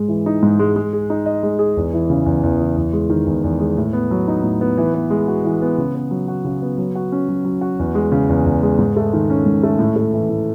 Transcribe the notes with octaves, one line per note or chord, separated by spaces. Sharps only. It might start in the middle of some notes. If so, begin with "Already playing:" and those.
Already playing: G#2 G#3
E3
D#4
G#2
G#3
G#3
G#4
D#4
D#5
G#3
G#4
E2
E3
C#3
E2
E2
E3
E2
G#3
D#3
E2
E2
G#3
A2
B3
F#3
D#4
A2
B3
E3
B3
G#3
F#4
E3
B3
C#3
B3
F#3
F#4
C#3
B3
F#3
F#4
C#4
F#3
F#3
F#4
E2
G#3
C#3
E2
E2
G#3
G#2
A3
D#3
C#4
G#2
A3
A2
A3
E3
A2